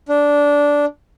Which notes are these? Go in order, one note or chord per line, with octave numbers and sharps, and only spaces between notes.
D4